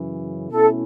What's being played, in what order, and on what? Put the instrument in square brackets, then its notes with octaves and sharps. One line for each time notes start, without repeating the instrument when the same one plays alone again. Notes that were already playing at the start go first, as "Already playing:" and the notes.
Already playing: [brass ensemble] F#2 C#3 E3
[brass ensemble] B2 A3 C#4 E4 [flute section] A4